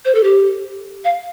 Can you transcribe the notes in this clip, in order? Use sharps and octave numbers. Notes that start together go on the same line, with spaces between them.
C5
A4
G4
F5